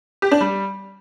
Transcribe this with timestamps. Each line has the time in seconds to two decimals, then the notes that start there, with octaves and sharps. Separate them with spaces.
0.22 G4
0.31 D4
0.41 G3